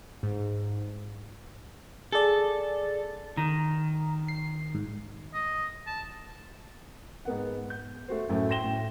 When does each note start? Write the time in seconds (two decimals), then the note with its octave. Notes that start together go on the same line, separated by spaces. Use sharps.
0.23 G#2
2.12 G#4 A4 D5
3.37 D#3 A#5
4.28 C7
4.75 G#2
5.34 D#5
5.87 A5
7.25 G#2 B3 F#5
7.70 G6
8.08 A3 F#4 C5
8.29 F#2 A2 F#3 A3
8.49 G5 C6 A#6 E7 G7
8.64 A2 G5